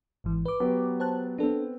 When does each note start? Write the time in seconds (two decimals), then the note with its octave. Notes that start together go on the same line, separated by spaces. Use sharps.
0.24 G#1 G#2 E3
0.46 B4 D6
0.60 F#3 B3 G4
1.00 C5 A5 F#6
1.38 B3 C4 D4 A4